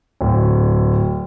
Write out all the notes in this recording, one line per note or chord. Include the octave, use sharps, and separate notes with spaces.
D1